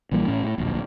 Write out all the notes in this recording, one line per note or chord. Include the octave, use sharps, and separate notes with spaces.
A#1 E3 G3 A#3
A1 A2 C#4
A2
D1 A#1